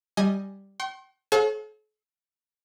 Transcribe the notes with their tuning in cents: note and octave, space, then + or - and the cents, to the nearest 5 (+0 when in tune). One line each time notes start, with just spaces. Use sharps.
G3 +0 D#5 +0 G#5 +0
G5 -35 C6 +35
A4 -45 C#5 -40 F5 +45